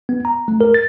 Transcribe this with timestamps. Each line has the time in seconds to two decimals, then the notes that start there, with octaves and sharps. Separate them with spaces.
0.09 B3
0.25 A#5
0.48 A3
0.61 A#4
0.74 A6